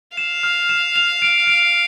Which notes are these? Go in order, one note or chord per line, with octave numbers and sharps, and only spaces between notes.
F5 E7
F6
E7
F7
D7
D7